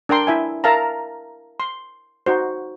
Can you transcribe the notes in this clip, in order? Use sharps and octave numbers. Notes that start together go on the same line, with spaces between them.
D4 A#4 G5 C6
E4 E5 G#5
A#4 E5 F5 A5 A#5
C6
D#4 F#4 C5